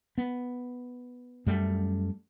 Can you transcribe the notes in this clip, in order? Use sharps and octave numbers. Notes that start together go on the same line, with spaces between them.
B3
F#2 G3 A3